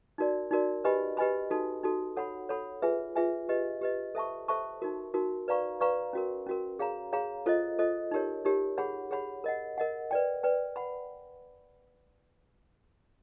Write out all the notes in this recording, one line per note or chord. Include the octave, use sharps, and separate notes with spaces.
D#4 F#4 A#4 D5
D#4 F#4 A#4 D5
G4 B4 D#5 G#5 B5
G4 B4 D#5 G#5 B5
D#4 F#4 A4
D#4 F#4 A4
A4 C#5 F#5 B5
A4 C#5 F#5 B5
F4 G#4 B4 E5 G#5
F4 G#4 B4 E5 G#5
G4 B4 D#5
G4 B4 D#5
A4 C5 E5 A5 C#6
A4 C5 E5 A5 C#6
D#4 F#4 A#4
D#4 F#4 A#4
B4 D5 F5 A#5 C#6
B4 D5 F5 A#5 C#6
C#4 F#4 A#4
C#4 F#4 A#4
G#4 C#5 F5 A#5
G#4 C#5 F5 A#5
F4 A4 C5 D#5
F4 A4 C5 D#5
D#4 G4 A#4 C#5
D#4 G4 A#4 C#5
G#4 C#5 F#5 B5
G#4 C#5 F#5 B5
A#4 D#5 F#5
A#4 D#5 F#5
B4 D5 G5
B4 D5 G5
F#5 B5